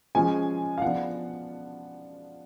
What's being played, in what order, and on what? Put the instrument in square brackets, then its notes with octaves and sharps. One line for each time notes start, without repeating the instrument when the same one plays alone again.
[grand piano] F3 G#3 C#4 G#5
F5
F3 B3 D4 F#5